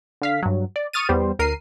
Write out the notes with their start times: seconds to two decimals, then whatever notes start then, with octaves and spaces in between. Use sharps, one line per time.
0.22 D3 F5 B6
0.43 G2 F#3
0.76 D5
0.93 C#6 D#6 F6 A6 D#7
1.09 E2 G3 B3 G4 C5
1.39 D2 A#4 C7 D#7